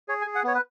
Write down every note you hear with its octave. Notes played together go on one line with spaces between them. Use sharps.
G#4 C#5
G#5
G#4
F#5
B3 C#5
B4